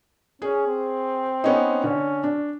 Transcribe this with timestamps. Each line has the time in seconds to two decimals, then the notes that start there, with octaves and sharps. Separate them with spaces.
0.42 C#4 G#4
0.67 C4
1.44 B3 C#4 D#4
1.84 D3 C#4
2.24 D4